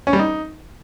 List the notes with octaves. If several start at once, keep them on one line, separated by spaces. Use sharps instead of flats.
C#4
G3
D#4